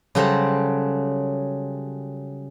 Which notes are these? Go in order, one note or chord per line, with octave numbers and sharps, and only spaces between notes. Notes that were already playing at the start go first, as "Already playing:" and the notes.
C#3 F#3 G3 A4 C5 A#5